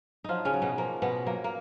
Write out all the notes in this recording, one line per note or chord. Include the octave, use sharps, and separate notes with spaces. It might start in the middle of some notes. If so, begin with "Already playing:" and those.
F3 F#3 D#4 F4
C#3 C#4
F#3
B2 B3
F3 A#3
B2 F3 B3
F#3 A#3
A#3